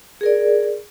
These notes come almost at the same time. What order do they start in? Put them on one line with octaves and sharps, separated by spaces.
G#4 A#4 D5